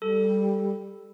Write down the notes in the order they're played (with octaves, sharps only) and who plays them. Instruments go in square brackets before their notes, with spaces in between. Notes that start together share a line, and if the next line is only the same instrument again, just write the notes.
[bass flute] G3 [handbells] A4